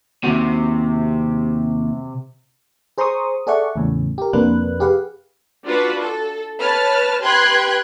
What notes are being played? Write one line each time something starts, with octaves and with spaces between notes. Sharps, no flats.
D#2 C3 F#4
G#4 C5 A#5 C6 C#6 D#6
G#4 A4 D5 E5 F#5 C#6
E2 A2 C#3
G4 A#4
F2 C3 A#3 D4 B4 F#6
G4 G#4 B4 F5 F#5
D4 F4 F#4 B4
A4
B4 C#5 A5 F6
G4 B4 G5 C6 F#6 G#6